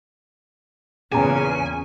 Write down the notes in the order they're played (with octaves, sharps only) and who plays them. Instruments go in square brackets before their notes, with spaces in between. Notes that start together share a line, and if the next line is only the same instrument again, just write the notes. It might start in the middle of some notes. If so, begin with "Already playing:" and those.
[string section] E2 A#2 C#3 [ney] C#4 [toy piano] G#4 G5 A#5 [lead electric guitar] G#5